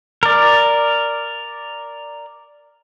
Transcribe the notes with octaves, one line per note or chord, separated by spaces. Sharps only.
A#4 D5